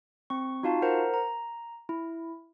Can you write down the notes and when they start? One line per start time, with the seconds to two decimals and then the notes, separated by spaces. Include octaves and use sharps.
0.30 C4 C#6
0.63 D#4 F4 F#4 F5 A5
0.82 A#4 C5 F#5 A#5
1.14 A#5
1.89 E4